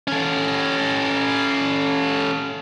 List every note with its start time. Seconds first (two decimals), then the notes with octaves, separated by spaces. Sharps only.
0.08 C#4 A4